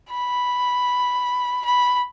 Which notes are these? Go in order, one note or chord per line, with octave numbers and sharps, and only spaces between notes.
B5
B5